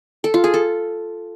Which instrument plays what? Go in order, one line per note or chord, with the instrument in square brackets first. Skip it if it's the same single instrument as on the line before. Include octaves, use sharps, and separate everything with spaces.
[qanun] A4
F4
G#4
A4